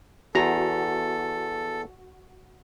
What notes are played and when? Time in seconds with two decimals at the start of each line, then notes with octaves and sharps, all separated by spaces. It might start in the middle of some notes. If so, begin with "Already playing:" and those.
0.35 E2 F#4 A4 A#5